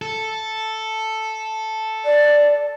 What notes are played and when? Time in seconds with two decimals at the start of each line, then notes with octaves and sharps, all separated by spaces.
0.02 A4
2.05 D5